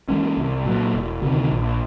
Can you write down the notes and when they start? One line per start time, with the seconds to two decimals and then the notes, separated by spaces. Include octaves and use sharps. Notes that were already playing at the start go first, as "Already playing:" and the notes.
0.09 E3 G#3 C#4
0.37 C2
0.65 A#2 F#3
0.94 E1
1.22 D2 C3 D#3
1.51 A#1